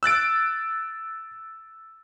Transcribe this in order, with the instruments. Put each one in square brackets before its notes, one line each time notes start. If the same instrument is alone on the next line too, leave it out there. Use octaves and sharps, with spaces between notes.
[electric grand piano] E6 F#6 A6 D7